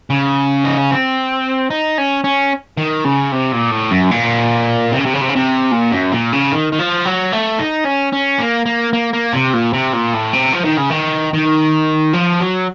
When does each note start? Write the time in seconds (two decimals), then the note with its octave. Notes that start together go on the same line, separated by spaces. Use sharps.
0.10 C#3
0.65 D#4
0.78 C#4
0.91 C4
1.70 D#4
1.98 C#4
2.24 C#4
2.77 D#3
3.05 C#3
3.32 C3
3.52 A#2
3.71 A2
3.91 F#2
4.11 A#2
4.92 C3
4.99 C#3
5.06 C3
5.14 C#3
5.21 C3
5.29 C#3
5.36 C3
5.72 A#2
5.92 F#2
6.12 A#2
6.33 C#3
6.52 D#3
6.72 D#3
6.79 F3
7.06 F#3
7.33 A3
7.59 D#4
7.85 C#4
8.13 C#4
8.39 A#3
8.66 A#3
8.93 A#3
9.13 A#3
9.33 C3
9.54 A#2
9.73 C3
9.93 A#2
10.14 A2
10.33 C3
10.54 F3
10.65 D#3
10.78 C#3
10.91 D#3
11.33 D#3
12.14 F3
12.41 F#3